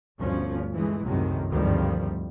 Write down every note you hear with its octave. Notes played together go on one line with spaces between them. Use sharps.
G1 D2 G2 F3 C#4
E3 G#3 A3
C2 F#2 A2 C3 D#3 G#3
G#1 D2 G2 D#3 F3 G3